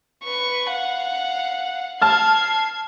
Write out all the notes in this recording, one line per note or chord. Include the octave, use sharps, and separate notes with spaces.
B4 C#6
F5 F#5
A5 F6 G#6 C7